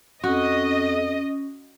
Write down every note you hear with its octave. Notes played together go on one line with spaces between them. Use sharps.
F2 C#4 F#4 D#5